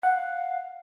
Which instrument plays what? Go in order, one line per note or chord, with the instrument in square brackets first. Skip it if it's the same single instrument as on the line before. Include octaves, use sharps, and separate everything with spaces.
[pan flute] F5 [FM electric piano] F#5